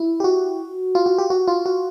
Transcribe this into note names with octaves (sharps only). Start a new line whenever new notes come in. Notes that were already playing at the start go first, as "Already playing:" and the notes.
Already playing: E4
G4
F#4
F4
F#4
G4
F#4
F4
F#4